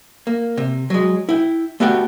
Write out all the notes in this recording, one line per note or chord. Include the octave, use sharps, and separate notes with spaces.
A#3
C3
F#3 G#3
E4 G5
A3 B3 F#4 G4 D5 G5